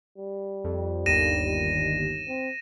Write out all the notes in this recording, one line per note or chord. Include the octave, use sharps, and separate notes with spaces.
G3
F2
G1 D#2 A#6 D#7 E7
C4